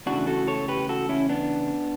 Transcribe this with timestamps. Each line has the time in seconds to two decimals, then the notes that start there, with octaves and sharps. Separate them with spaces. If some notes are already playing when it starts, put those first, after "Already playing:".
0.06 E2 C#3 E3 A3 D4 F#4
0.27 F#4 A4
0.47 A4 C#5
0.68 G4 B4
0.89 F#4 A4
1.09 C#4 E4
1.29 B3 D4